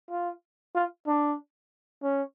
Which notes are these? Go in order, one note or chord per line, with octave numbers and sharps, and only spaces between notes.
F4
F4
D4
C#4